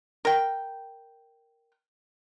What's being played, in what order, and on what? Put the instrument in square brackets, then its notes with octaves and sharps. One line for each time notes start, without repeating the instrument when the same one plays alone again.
[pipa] A#4 G5